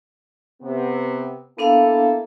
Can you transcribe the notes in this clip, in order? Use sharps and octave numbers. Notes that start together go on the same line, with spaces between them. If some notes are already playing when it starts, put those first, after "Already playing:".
C3 B3
A#3 B3 D4 E4 A4 F5